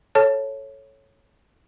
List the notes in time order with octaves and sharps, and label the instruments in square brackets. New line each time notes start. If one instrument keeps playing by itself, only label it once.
[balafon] A4 C#5 A5